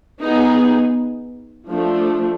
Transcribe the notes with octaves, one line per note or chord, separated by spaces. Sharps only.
B3 D#4 G#4
F3 A3 D4